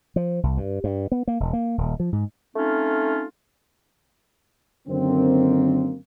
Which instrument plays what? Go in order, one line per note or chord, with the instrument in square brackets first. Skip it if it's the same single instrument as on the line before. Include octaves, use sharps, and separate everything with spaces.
[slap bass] F3
C2
G2
G2
B3
A#3
E1
A#3
D#1
F3
G#2
[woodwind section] A3 C4 C#4 D#4 F4
[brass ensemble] F#2 D3 D#3 A#3 C4